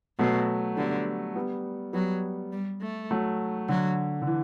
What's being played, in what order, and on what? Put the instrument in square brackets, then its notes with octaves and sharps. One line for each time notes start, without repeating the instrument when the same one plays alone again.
[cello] B2 [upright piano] F#3 A3
[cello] D3 [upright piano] G3 B3
[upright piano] G3 B3
[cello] F#3 [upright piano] G3 B3
[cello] G3
A3
[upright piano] F#3 A3
[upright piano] D3 [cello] F#3
[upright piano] D3
E3